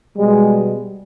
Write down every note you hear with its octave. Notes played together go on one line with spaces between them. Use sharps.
B2 G3 G#3